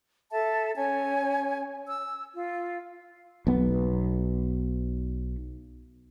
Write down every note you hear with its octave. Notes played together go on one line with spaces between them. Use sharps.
A4 E5 A5
C#4 G#5
E6
F4
B1 B3